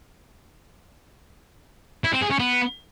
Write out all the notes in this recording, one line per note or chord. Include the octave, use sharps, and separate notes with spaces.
E4
C4
G#4
C#4
B3